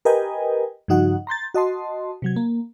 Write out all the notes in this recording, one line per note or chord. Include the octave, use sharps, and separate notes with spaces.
G4 A#4 B4 D#5 G5 G#5
G2 C#3 F3 D#4 F#4 F#5
A#5 C6 G6 A6
F#4 D#5 A5 C6
C3 F#3 G#6
A#3